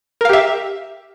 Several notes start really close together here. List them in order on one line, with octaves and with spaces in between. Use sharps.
A#4 F5 G4 E5